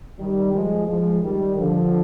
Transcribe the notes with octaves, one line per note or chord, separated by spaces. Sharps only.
D#3 G3
F3 G#3
F3 G#3
D#3 G3
D3 F3